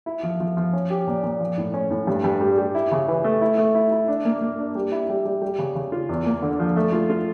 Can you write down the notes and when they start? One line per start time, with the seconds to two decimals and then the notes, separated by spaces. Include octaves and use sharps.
0.06 E4
0.23 F3
0.40 F3
0.57 F3
0.73 C#4
0.90 G4
1.07 A#2
1.24 A#2
1.40 F3
1.57 A2
1.74 C#4
1.90 A2
2.07 G2
2.24 G2
2.41 G3
2.58 G3
2.75 E4
2.92 C#3
3.08 E3
3.24 A3
3.41 E4
3.58 A3
3.75 E4
3.91 E4
4.08 D4
4.25 A#3
4.41 A#3
4.59 D4
4.75 G3
4.92 E4
5.09 G3
5.26 G3
5.42 G3
5.59 C#3
5.75 C#3
5.92 F4
6.09 E2
6.26 A#3
6.42 D3
6.60 F3
6.76 A3
6.92 F4
7.10 F4